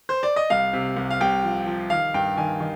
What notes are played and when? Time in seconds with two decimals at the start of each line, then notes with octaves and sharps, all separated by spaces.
0.09 C5
0.23 D5
0.36 D#5
0.50 C2 F5
0.73 C3
0.97 C2
1.11 F5
1.21 C2 G5
1.44 F3
1.67 F3
1.90 D#3 F5
2.14 G2 G5
2.37 D#3 G#5
2.60 D#3